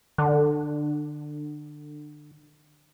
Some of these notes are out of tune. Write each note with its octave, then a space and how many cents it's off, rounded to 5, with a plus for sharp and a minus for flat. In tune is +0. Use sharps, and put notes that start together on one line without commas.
D3 +25